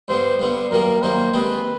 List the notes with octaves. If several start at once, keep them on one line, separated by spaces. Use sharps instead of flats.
G2 D3 G3 B3 C5
G2 D3 G3 B3
F#2 D#3 G3 A#3 A#4
F#2 D#3 G3 A#3 C5
D#2 D#3 G#3 C4 B4